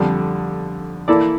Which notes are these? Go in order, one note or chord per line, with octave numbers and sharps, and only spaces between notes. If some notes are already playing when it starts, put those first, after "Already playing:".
Already playing: F2 D3 G3
E3 A#3 E4 A4 D5